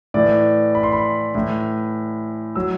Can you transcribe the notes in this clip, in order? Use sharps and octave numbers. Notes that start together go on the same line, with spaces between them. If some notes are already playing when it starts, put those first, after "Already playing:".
A2 E3 D5
B5
C6
B5
A2 E3
F#3 E6